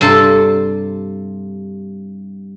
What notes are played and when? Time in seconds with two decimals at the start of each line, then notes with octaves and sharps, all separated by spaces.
0.01 G2 C3 A4 C5 A5